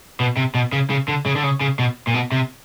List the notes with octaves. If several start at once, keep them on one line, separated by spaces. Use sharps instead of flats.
B2
C3
B2
C#3
C#3
D3
C#3
D3
C#3
C#3
B2
A#2
B2
C3